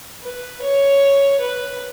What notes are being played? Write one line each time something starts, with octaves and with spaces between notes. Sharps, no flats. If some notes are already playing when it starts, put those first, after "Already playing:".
B4
C#5
B4